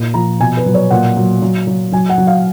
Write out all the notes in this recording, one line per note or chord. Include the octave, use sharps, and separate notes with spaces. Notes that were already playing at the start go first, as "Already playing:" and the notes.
Already playing: A#2
F3 A#5
B2 G#5
B4
F#3
C#5
A#2 F#5
F#3
F#3
F#3
F#3 G#5
F#5
F#3
F5